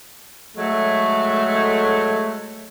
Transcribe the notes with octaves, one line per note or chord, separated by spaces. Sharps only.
F#3 G#3 A3